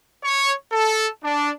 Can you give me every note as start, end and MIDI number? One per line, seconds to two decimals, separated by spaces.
0.23 0.52 73
0.71 1.09 69
1.23 1.51 62